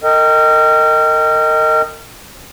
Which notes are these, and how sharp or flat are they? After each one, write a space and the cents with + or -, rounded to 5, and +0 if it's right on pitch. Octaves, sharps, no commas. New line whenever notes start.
A#4 -35 D#5 +0 G5 +0